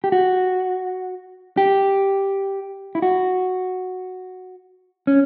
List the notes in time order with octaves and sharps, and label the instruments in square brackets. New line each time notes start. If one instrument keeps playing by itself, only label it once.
[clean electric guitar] G4
F#4
G4
E4
F#4
C#4